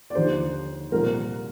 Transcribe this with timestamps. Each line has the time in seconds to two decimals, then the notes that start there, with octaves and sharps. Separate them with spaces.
0.10 D5
0.15 D#2 D3 F3 C5
0.92 C2 A#2 F3 A#4